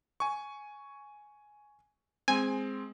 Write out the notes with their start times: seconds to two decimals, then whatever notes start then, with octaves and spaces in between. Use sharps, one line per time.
0.20 G#5 C#6
2.28 G#3 C4 G#5